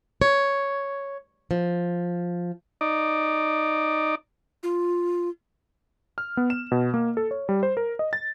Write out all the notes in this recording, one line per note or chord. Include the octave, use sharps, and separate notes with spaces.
C#5
F3
D#4 D5
F4
F6
B3
E7
B2
A#3
A4
C#5
G3
C5
A#4
D#5
A6